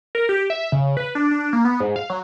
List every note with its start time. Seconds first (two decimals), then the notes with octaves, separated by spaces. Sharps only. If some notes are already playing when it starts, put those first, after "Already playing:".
0.15 A#4
0.29 G4
0.50 E5
0.72 C#3
0.97 B4
1.15 D4
1.31 D4
1.53 A#3
1.65 B3
1.80 G#2
1.96 F5
2.10 F#3